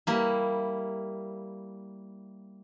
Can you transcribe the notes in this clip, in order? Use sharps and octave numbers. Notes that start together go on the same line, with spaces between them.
G3 A#3 E4